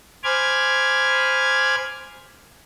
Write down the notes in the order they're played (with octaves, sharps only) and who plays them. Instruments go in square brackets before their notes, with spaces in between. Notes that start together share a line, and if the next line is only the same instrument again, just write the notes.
[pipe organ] C5 G#5 B5 D6 F6 G#6